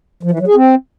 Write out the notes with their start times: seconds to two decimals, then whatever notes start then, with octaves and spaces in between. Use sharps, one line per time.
0.23 F3
0.31 E3
0.39 F#3
0.47 G#4
0.55 C4